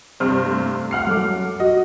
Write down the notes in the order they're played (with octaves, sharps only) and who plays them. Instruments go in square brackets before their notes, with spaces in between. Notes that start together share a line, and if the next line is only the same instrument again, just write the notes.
[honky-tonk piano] G2 C3 C4 [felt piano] F6
[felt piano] A3
[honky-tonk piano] F#5 F6 C7
[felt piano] F#2 A4 D6
[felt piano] F#4 [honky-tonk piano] D#5